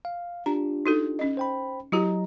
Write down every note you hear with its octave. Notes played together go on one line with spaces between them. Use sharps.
F5
D4 F4 G4 A#5
D#4 F#4 A4
C#4 D#5
C5 G5 B5
F#3 E4 F#4 G4 D#5 A#5